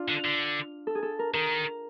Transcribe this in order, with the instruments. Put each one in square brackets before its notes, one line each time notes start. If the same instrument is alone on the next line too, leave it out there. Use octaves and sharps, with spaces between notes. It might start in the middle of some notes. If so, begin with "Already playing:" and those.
Already playing: [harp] D4 F4
[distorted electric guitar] D3
D3
[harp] A4
G#4
A4
A#4
[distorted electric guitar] D#3 [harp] A#4